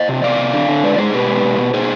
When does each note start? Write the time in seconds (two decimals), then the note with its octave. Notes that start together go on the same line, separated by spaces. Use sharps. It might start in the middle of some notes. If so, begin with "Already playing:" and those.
Already playing: C5 D#5
0.09 C3
0.23 C3 D5 F5
0.38 C3
0.54 D3
0.69 D3
0.83 G#3 B4 D5
0.98 G#3 G#4 C5
1.13 B2 G4 B4
1.28 G#3
1.44 B2
1.58 B2
1.74 B2 G#4 C5